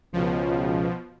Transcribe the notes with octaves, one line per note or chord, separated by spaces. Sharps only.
C#2 B2 F3